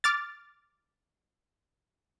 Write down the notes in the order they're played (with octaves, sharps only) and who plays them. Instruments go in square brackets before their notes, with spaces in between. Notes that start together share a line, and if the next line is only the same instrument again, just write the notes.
[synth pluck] D6 F6 A6